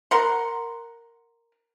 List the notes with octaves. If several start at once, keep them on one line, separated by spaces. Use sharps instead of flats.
A#4 F#5 C6